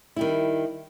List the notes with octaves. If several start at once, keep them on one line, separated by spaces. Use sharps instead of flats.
D#3 G3 E4